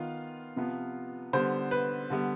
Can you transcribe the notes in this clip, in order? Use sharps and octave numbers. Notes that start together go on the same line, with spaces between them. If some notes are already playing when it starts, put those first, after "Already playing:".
Already playing: D#3 B3 F4 F5
C3 F3 B3
D3 G3 B3 C5
B4
D3 G3 B3